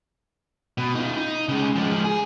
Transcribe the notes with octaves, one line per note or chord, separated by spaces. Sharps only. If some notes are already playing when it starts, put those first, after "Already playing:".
B2
D#4 F4
D#4
C#3 G#3
F3 G#3
G#4